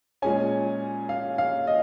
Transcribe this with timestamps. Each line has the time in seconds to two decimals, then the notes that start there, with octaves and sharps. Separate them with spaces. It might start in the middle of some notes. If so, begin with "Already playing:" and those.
0.22 A#2 G#3 C#4 G#5
1.09 F5
1.38 F5
1.67 D#5